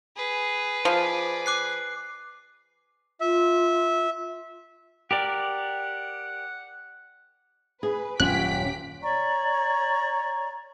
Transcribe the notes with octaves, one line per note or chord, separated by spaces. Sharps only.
G#4 B4
F3 G#4 D5
D6 F#6 C7
F4 E5
G4 A#4 D5 F#5
G#4 B4
D#1 F#2 C#4 F4 G4 F#6 B6 D7
C#5 D5 A#5 C#6